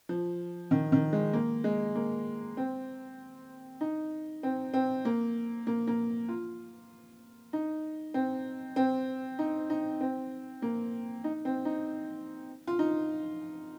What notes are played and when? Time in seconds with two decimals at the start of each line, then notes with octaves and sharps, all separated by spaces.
0.09 F3
0.71 D#3
0.92 D#3
1.13 G#3
1.33 A#3
1.64 G#3
1.95 A#3
2.57 C4
3.81 D#4
4.43 C4
4.74 C4
5.05 A#3
5.67 A#3
5.87 A#3
6.29 F4
7.53 D#4
8.14 C4
8.76 C4
9.39 D#4
9.70 D#4
10.01 C4
10.62 A#3
11.24 D#4
11.45 C4
11.65 D#4
12.67 F4
12.79 D#4